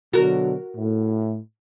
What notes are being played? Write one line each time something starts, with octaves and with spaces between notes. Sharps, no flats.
B2 D3 F#3 F#4 A#4
A2